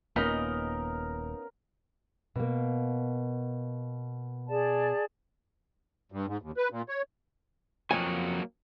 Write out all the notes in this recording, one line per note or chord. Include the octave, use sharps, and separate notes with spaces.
D#1 A#3 B3 C#4 D#4 F4 A#4 D#5
B2 A#3
G#4 D5 A5
G2
G#2
D#2
B4
A#2
C#5
F2 F#3 A#3 F#4 G#5